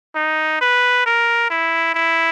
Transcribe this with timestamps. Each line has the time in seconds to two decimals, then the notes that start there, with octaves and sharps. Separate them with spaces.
0.16 D#4
0.61 B4
1.06 A#4
1.50 E4
1.95 E4